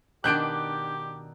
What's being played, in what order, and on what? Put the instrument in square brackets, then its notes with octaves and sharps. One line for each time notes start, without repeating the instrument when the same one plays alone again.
[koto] B2 D#3 D4 [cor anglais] G4 [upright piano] F#6 G6 D7